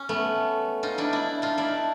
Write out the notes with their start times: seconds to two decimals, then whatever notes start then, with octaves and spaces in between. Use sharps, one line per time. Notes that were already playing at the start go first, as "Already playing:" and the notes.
Already playing: C#4
0.09 A3 B3
0.83 D#4 F4
0.98 D4 E4
1.13 D4 E4
1.42 D#4 F4
1.58 D4 E4